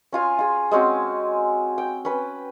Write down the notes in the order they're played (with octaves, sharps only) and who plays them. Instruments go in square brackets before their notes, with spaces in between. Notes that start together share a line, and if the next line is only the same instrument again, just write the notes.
[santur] C#4 F4 G#5
F4 G#4
G#3 C4 C#4 F#4
G5
C#4 B4